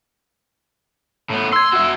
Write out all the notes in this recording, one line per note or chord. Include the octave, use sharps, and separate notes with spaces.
A2 B3
C6 E6 G#6
F#4 E5 E6